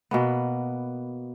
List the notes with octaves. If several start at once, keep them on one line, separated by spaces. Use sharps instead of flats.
B2 A#3 B3